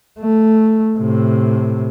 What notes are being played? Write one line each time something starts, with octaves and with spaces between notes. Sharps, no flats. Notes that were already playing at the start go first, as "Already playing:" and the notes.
A3
A2 C3